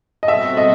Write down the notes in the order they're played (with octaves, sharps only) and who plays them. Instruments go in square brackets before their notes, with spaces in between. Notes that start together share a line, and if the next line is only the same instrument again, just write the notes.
[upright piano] D#5
[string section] B2 G3 C4 F#4 A4 [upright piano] E5
[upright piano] D#5